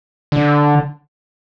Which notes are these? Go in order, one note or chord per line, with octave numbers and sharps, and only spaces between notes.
D3